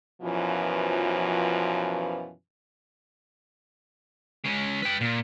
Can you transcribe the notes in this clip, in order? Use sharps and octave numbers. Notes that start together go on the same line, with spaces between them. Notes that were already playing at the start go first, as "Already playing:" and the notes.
F#2 B2 E3 F3
G#3 C#4
B4 G5
A#2